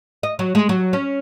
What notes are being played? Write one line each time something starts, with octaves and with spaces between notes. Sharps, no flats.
D#5
F#3
G#3
F#3
C#4